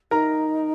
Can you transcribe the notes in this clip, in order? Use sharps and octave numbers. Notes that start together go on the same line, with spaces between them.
D#4 A#4 A#5